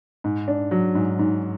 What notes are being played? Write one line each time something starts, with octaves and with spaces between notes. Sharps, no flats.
G#2
D4
F#3
G#2
G#2